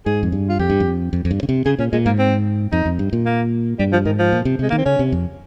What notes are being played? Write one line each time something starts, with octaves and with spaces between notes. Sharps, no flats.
G#2 G#4
F2
G2
F4
F2 G4
G2
F2
F2
F2
G2
C#3
C3
C#3 G#4
A#2 C#4
A#2 G#3
G#2 A#3
C4
F2 D#4
F2
G2
A#2
A#3
G2 G3
F3
G#2 D#3
F3
A#2
C3
C3 G#3
D#3 A#3
C4
C#3 C#4
C3
F2